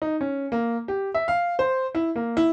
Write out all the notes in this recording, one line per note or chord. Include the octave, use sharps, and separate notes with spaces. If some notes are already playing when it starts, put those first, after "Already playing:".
D#4
C#4
A#3
G4
E5
F5
C5
E4
A#3
E4